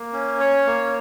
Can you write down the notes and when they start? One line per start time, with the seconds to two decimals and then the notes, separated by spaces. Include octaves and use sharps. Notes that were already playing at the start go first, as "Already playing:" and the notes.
Already playing: A#3
0.13 C#4
0.40 C#5
0.67 A#3